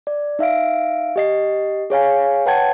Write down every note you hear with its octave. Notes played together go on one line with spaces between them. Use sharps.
D5
D#4 E5 F5 D7
G4 D#5 C7
G#4 C#5 F5 G#5
B4 C#5 F#5 G5 A5 G#6